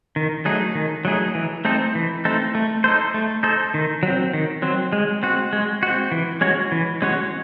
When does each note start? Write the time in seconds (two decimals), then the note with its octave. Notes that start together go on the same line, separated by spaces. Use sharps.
0.16 D#3
0.45 F#3 A3 D#4 G#4
0.75 D#3
1.05 F#3 A3 D#4 G#4
1.35 E3
1.65 A3 C4 D#4 A4
1.95 E3
2.25 A3 C4 D#4 A4
2.55 A3
2.84 D#4 A4 C5
3.14 A3
3.43 D#4 A4 C5
3.74 D#3
4.03 F#3 C4
4.33 D#3
4.62 F#3 C4
4.93 G#3
5.23 C4 F#4
5.53 G#3
5.83 C4 F#4
6.12 E3
6.41 G#3 C#4 F#4 C#5
6.72 E3
7.02 G#3 C#4 F#4 C#5